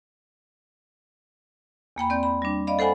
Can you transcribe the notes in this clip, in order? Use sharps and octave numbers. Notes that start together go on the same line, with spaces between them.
E2 A#3 G5 B5
C4 D5 G6
B5
G3 D4
D5 D#5 F5 B5
A4 C5 F#5 G#5 B5